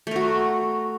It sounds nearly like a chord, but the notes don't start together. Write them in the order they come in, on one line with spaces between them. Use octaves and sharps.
A3 A#4 F#4